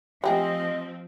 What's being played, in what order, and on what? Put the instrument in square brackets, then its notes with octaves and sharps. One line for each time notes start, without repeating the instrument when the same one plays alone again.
[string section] F3 C4 [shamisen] A3 G4 G#4 [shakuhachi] D#5